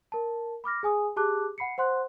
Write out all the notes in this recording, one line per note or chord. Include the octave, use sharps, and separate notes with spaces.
A#4 A5
B5 D6 F6 A#6
G#4 G#5 D#6
G4 G#4 A5 D6 F#6
F#5 B5 C7 C#7
C5 F#5 C6 F#6